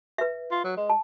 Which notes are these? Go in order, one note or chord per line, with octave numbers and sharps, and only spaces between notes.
B4 E5
F4
F#3
G#3
A5